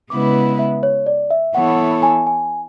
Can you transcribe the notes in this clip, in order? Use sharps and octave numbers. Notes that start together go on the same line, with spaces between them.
C#3 G#3 B3 E4 B4 D6
E5
C#5
D5
E5
E3 B3 E4 A4 C#5 F#5
G#5
G#5